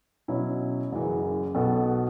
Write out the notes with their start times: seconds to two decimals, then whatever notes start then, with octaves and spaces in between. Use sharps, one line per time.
0.28 B2 F#3 C#4 E4 B4
0.92 F#1 F#2 C#3 E3
1.55 B1 B2 B3 F#4 A4